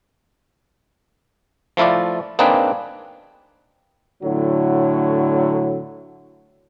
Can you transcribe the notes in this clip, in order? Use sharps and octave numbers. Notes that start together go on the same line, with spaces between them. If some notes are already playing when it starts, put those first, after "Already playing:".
F3 A3 E4 F4 D5
A#3 C4 D4 D#4 G#4 B4
A2 D3 F#3